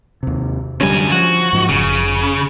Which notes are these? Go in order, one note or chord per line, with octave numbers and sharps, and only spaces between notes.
D#2 C3
F#2 D3 G3 C#4 G#5
F3 F#4
G#2 F3
F1 C#3